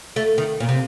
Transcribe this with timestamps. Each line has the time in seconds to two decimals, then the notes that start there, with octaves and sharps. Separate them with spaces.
0.16 A3
0.38 D#3
0.60 A#2
0.69 C3